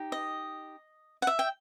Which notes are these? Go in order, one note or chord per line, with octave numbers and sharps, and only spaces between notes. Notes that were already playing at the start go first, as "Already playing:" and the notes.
Already playing: D#4 G4
D#5
F#5
E5
G5